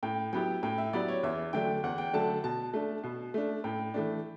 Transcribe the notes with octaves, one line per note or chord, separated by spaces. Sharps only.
A2 G5
F#3 B3 E4 G4 G5
A2 G5
E5
F#3 B3 E4 G4 D5
C#5
E2 E5
D3 F#3 A3 D4 G5
E2 F#5
G5
D3 F#3 A3 D4 A5
B2 A5
A3 D4
B2
A3 D4
A2 G5
E3 A3 D4